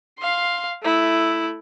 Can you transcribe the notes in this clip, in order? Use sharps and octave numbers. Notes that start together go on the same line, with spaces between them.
F5 C6
A3 E4